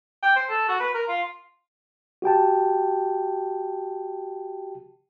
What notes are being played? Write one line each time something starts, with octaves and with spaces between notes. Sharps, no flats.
G5
C5
A4
F#4
B4
A#4
F4
F#4 G4 G5 A5